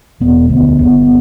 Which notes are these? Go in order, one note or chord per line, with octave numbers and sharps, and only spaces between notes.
E1 B3
D2 B3
G1 B3